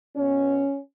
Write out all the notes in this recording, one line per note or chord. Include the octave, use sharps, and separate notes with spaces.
B2 B3 C#4